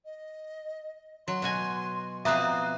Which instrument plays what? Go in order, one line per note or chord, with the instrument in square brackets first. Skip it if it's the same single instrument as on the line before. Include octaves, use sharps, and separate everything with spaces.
[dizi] D#5
[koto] F#3 [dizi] C6
[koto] B2 F#4 G#5
[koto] B2 F3 C4 [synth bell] E5 A#5 F#6 [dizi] D#6